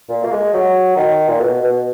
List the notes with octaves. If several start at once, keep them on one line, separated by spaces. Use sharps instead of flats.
A#2
A#3
G#3
F#3
D#3
A#2
B2
B2